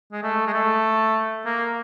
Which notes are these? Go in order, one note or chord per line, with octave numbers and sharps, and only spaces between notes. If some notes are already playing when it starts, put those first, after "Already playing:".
G#3
A3
G#3
A3
A#3